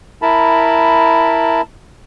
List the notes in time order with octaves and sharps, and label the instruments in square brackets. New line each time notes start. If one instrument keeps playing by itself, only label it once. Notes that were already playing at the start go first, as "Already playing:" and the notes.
[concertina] E4 A#4 A5 B5